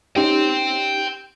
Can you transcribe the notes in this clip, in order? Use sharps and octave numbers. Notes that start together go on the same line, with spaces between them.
C#4 D#4 G4 G5 C6